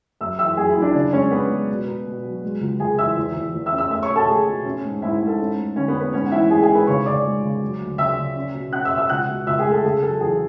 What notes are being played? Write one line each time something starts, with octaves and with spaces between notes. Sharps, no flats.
F#2 E5 E6
E3 E5 E6
F#2 G#4 G#5
E4 E5
F#2
D4 D5
C#3 D4 D5
G#3 C#4 C#5
B3 C#4 B4
G#3
B2
B3
B2
F#3
G#3
C#2
C#2 G#4 G#5
E3 E5 E6
E2
E2
E2
E5 E6
C#4
E5 E6
A3 E5 E6
C#5 C#6
B2
A4 A5
A3 G#4 G#5
B2
C#4
G#2
G#2 E4 E5
G#2
A4
C#4
A3
D3 C#4 C#5
B3 B4
C#4
B3 B4
G#2 C#4 C#5
F#5
E3 E4 E5
A3 G#4 G#5
G#4 G#5
G#2
B4 B5
C#3 C#5 C#6
C#3 D5 D6
G#3
C#3
F#3
D2
C#3 E5 E6
C#3
C#4
B2
C#4 F#5 F#6
E5 E6
B2
E5 E6
C#2 F#5 F#6
B2
C#2 E5 E6
G#4 G#5
A3
A4
C#3 G#4
F#3 A4
E2 G#4